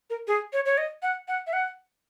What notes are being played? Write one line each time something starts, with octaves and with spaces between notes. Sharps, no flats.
A#4
G#4
C#5
C#5
D#5
F#5
F#5
E5
F#5